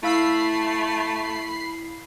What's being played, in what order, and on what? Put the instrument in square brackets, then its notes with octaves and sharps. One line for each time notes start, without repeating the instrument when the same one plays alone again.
[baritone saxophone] A3 [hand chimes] E4 F5 E6 [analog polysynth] B5 C7